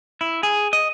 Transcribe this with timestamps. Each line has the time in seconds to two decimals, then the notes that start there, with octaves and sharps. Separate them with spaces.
0.21 E4
0.43 G#4
0.73 D#5